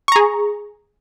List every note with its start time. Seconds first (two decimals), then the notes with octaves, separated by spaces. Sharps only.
0.08 C#6
0.12 A#5
0.16 G#4